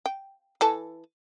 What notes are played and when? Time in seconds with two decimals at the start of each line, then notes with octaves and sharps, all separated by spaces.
0.06 G5
0.61 E3 A4 A5